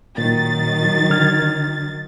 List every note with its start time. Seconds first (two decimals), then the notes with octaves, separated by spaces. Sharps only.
0.18 A#2 D#3 F#3 A6
1.10 D3 F6 G#6